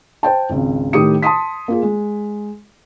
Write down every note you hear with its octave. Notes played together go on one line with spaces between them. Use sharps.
C5 G5 A5
G#1 C#2
A2 D#3 G4 D#6 C#7
A5 C6 D#6 B6
A#3 F4 G#4
G#3